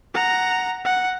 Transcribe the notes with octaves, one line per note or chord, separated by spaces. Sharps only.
F#5 A#5
F#5